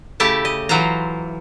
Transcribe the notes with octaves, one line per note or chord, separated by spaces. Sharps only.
C#3 A3 E4 G4 A5
D#5
E3 F#3 F4 C5 A#5